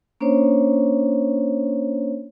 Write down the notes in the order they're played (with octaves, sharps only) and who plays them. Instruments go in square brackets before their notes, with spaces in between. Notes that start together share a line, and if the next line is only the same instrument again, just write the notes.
[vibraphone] A#3 C#4 D4 C5 C#5